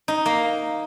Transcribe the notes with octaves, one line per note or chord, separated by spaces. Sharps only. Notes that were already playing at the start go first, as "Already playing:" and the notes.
D#4
A#3